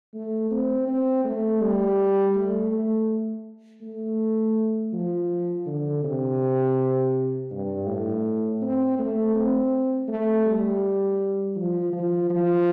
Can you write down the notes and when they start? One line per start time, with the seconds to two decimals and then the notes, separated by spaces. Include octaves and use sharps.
0.14 A3
0.51 C4
0.87 C4
1.25 A3
1.61 G3
2.35 A3
2.72 A3
3.82 A3
4.93 F3
5.66 D3
6.04 C3
7.51 G2
7.87 A2
8.62 C4
8.99 A3
9.35 C4
10.08 A3
10.46 G3
11.56 F3
11.93 F3
12.30 F3